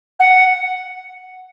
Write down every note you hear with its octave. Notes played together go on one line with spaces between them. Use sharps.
F#5